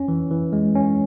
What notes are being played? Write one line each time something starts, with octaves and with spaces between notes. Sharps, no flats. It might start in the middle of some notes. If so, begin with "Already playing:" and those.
Already playing: C#4
E3
E3
G#3
C#4